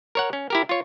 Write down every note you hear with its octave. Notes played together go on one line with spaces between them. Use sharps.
A#4 C#5 F#5
C#4
E4 G4 A#4
F4 C#5